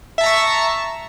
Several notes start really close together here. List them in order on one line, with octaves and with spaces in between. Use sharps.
E5 A5 A#5 C#6